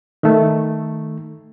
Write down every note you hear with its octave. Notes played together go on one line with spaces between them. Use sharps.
D#3 A3